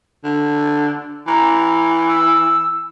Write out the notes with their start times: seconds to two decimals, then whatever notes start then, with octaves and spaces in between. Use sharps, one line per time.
0.24 D3
1.27 E3 A#5
2.07 E6